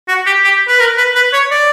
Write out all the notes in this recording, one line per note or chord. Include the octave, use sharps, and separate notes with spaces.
F#4
G4
G4
B4
A#4
B4
B4
C#5
D5